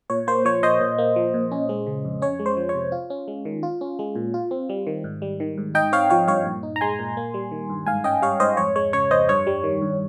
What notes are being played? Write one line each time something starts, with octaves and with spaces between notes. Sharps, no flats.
A#2 C#5
A#3 C5
F3 C#5
A#2 C5 D#5
A#2
A#3
F3
A#2
C#4
G#3
C#3
F2
C#4 C#5
G#3
C5
F3
C#5
C3
F4
C#4
G#3
D#3
F4
C#4
G#3
A#2
F4
C4
G3
D#3
G#2
G3
D#3
G#2
D#4 D#5 G5
C4 C#5 F5
F3 C#5 F5
G2 C#5 F5
A#2
D#4
A#5
G#3 G#5 C6
A#2
A#3
G3
D#3
G2
G#2 F5 G#5
C#4 D#5 G5
G3 C#5 F5
G#2 C5 D#5
F2 C#5
G#3 C#5
C#3 C#5
F2 C5 D#5
G2 C#5
G3
D#3
G2